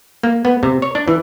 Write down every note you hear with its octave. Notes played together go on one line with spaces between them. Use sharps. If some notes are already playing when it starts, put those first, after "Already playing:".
A#3
B3
C3
C#5
D4
E3